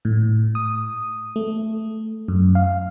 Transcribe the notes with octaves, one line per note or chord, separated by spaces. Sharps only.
A2
D#6
A3
F#2
F5